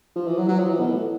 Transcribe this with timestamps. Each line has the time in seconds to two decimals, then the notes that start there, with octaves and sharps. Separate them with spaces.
0.16 F3
0.27 E3
0.37 F#3
0.48 F#3
0.59 F3
0.70 E3
0.80 B2
0.91 A2